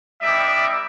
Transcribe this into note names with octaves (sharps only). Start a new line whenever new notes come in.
G3 B3 D#4 G4 D5 E5